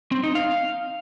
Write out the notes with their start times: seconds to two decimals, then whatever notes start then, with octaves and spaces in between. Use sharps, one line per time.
0.12 C4
0.23 D#4
0.35 F5